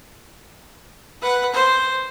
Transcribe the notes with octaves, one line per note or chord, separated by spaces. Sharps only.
B4 F#5
C5